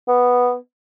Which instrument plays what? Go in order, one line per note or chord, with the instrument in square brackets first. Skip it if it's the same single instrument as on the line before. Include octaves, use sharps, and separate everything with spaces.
[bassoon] B3